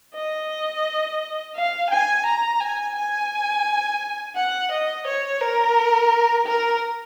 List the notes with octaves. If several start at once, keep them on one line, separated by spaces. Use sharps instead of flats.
D#5
F5
G#5
A#5
G#5
G#5
F#5
D#5
C#5
A#4
A#4